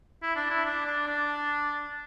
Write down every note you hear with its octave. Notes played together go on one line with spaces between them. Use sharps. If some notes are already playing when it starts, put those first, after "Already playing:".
E4
D4
E4
D4
D4
D4